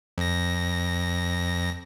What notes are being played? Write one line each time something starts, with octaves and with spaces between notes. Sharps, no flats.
F2 A#6